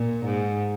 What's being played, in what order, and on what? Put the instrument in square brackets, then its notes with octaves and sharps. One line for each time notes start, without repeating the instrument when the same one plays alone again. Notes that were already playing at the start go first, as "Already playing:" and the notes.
Already playing: [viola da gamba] A#2
G#2